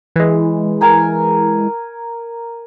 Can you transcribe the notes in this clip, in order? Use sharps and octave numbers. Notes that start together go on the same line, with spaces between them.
E3 G#3
A#4 G#5 A#5